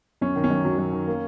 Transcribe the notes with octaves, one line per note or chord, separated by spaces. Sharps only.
F#2 C#4
D#3
C#4
F#2
F#3
F#2
D#3
A#3